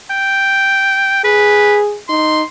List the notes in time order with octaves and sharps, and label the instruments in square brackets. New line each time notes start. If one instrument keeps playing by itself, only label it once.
[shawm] G5
[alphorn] G#4 [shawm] B4
[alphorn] D#4 [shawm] C6